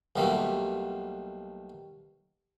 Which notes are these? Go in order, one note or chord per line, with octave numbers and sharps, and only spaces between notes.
B1 B2 G3 A3 A#3